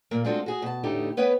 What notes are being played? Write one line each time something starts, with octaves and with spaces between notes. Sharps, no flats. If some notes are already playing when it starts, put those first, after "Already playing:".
A#2 A#3
G#3 C4 D4 F4 F#4 A4
F#4 G#4
B2 A5
E2 A2 D3 A3 D#4 G4
B3 B4 C#5 G5